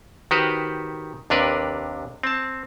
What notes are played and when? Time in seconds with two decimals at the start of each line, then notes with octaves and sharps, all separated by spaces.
0.31 D#3 F#4 G4 B4 C5
1.30 D#2 C3 D4 A#4 B4
2.23 C4 A5